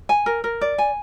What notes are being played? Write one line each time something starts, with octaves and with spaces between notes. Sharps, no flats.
G#5
A#4
A#4
D5
G#5